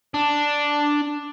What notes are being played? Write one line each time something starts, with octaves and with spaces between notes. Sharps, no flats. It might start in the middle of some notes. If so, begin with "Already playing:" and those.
D4